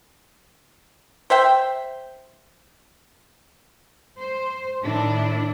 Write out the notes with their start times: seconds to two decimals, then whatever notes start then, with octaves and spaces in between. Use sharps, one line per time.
1.30 C5 E5 G5
4.17 C5
4.82 A2 D#3 D4 E4